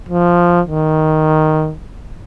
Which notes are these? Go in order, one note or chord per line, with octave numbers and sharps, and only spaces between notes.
F3
D#3